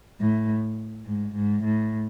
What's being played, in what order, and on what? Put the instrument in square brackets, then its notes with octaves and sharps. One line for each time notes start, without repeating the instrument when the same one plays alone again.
[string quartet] A2
G#2
G#2
A2